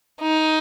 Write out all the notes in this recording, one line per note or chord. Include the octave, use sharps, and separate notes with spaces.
D#4